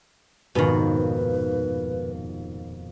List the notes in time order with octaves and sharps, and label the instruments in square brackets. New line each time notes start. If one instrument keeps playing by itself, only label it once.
[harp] D#1 F2 G#2 [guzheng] B2 D#3 [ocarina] B4